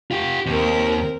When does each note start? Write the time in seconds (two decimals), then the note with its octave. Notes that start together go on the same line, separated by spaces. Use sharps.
0.11 F4 G4
0.47 D#2 C4 A#4